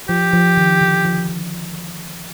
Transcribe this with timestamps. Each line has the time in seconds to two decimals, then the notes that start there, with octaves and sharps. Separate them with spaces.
0.08 F3 G4
0.33 F3
0.57 D#3
0.81 D3
1.05 F3
1.29 F3